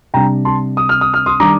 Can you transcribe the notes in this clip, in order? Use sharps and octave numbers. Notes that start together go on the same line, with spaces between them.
C3 G3 D4 G5 A#5
A5 C6
D#6
F6
D#6
F6
C6 D#6
D#3 G3 D4 A#5 D6